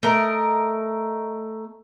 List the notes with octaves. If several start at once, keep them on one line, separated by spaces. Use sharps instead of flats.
A3 A#4 D#5